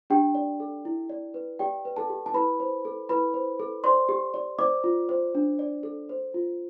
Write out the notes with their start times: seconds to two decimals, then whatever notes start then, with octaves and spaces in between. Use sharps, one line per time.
0.10 D4 G4 G5
0.35 D5
0.60 A4
0.85 E4
1.09 D5
1.34 B4
1.59 G4 D5 G5
1.85 B4
1.97 A4 A5
2.09 G4
2.26 A5
2.34 E4 B4 B5
2.60 C5
2.85 A4
3.09 E4 B4 B5
3.34 C5
3.60 A4
3.84 C5 D5 C6
4.09 G4
4.34 D5
4.59 C5 D5 D6
4.84 F4
5.09 C5
5.35 D4
5.59 D5
5.83 A4
6.09 C5
6.34 F4